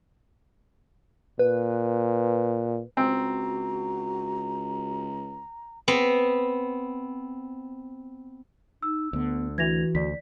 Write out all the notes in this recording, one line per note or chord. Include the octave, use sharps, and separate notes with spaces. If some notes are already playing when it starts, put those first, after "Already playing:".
A#2 B4
C#2 C4 F#4 A#5
B3 C4
D#4 E6
D2 D3 B3
E3 F#4 G#6 A#6 F7
D2 D5 B6